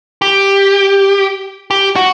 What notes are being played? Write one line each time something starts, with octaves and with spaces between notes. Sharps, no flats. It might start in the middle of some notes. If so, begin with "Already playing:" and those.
G4
G4
F#4